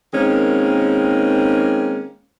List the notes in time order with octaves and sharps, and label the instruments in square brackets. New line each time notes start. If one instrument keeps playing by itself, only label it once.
[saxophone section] D#3 G#3 A#3 C4 C#4